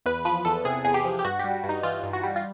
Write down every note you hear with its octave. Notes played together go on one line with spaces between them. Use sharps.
E2 B4
F3 B4
E2 A4
C3 G#4
E2 G#4
G4
F3
G4
G2 F#4
G3 G4
G2
D#4
E3 F4
G2
F#4
G3
F4